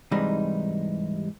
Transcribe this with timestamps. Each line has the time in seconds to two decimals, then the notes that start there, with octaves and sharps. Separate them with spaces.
0.11 G#2 C3 E3 G3 G#3 D#4